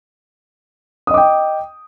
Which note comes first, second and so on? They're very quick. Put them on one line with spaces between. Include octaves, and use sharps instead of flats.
D#6 D#5 D6 G5